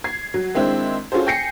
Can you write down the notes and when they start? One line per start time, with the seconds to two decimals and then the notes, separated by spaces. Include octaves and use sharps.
0.04 G#6 C7
0.34 F#3
0.55 D#3 G#3 C4 D4 E4 C5
1.12 C#4 F4 F#4 G#4 A4 C5
1.27 G5 G#5 G6 A#6 C7 C#7